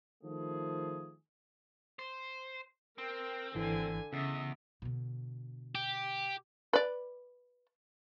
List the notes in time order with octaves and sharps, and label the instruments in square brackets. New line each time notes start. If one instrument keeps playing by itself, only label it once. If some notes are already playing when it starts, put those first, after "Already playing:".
[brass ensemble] D#3 F3 A3 G#4
[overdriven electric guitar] C5
[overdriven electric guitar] C4 [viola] A#4 G5
[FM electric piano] G#1 E3 [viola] D3 G#5
[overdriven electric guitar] E2 [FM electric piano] C#3 [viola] D#5 E5
[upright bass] B2 D3
[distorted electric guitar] G4
[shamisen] B4 D5